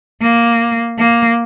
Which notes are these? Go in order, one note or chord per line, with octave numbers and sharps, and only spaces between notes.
A#3
A#3